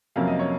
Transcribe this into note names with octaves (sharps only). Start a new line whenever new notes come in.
F2 C3 F#3 A#3 C#4 F5
D#5
C#5